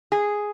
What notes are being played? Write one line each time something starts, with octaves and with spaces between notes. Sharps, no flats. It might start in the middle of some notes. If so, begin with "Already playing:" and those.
G#4